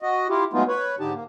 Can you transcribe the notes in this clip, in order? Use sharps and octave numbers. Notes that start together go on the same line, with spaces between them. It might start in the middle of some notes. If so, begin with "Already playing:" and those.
F#4 D#5
E4 F4 G4
F#3 G#3 A3 B3 D#4 F4
B4 C#5
G#2 D3 D#4 G4 A5
A#3